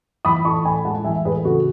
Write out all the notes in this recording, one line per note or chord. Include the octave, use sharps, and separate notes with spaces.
E3 B5 D#6
A2 A5 C#6
A2 G#5 B5
G#3 F#5 A5
E3 E5 G#5
A2 G#4 B4
C#3 F#4 A4